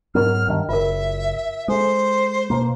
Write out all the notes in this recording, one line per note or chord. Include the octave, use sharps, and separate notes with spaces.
G#2 F#3 B3 E4 A#4 D#5 F6
G2 D#3
F#1 F4 A#4 E5
G#3 A4 C5
B2 A#3